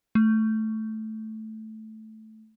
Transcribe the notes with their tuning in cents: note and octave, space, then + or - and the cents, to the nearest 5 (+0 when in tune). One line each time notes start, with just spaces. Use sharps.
A3 -5